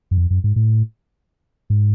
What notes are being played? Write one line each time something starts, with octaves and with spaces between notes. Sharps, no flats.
F#2
F2
F#2
G#2
A2
G#2